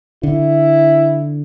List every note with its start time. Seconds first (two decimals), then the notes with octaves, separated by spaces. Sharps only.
0.23 D3 E4